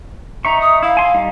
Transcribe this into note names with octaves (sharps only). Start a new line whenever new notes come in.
D#4 E5 A#5 C#6
D#6
E4 F5
G#5 C6
G3 D#4